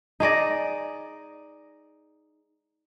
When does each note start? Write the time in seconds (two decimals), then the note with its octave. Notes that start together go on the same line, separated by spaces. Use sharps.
0.20 D#4 G#4 D5 D#5